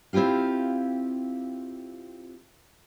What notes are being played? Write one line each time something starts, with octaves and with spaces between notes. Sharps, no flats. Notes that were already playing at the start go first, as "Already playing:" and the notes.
C4 E4 F4 G4 F5